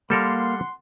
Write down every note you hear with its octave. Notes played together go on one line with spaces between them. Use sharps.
G3 A#3 A4 A#4 F5 F#5 C6